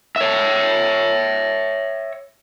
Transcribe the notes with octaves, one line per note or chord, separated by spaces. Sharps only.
C#5 E5